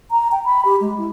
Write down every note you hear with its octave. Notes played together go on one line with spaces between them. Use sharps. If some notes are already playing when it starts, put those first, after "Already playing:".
A#5
G5
B5
G4
G#3
E4